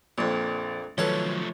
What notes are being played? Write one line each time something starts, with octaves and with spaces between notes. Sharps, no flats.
A#1 F2 A#2
D#3 F3 F#3 A3 C#4 A4 B4 C#5